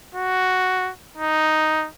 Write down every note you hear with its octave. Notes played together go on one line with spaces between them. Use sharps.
F#4
D#4